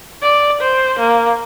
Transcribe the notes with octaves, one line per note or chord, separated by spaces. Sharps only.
D5
C5
A#3